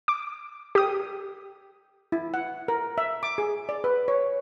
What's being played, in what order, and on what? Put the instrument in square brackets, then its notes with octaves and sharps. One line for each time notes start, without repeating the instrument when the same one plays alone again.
[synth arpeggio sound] D6
G4 D#6
[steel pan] E4
F#5
A#4
E5
D6
G#4
D5
B4
C#5